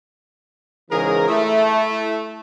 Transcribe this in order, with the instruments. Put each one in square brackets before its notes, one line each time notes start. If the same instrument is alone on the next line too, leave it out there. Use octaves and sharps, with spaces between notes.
[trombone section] G#2 C#3 E3 [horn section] G#4 A#4
[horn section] A3 [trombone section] E4